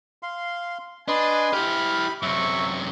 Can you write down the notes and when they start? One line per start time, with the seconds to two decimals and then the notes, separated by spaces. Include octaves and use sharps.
0.23 F5 C6
1.08 D4 B4 D#5 G#5 C6
1.53 E4 G4 B5 F6
2.22 F#2 C3 E5 C#6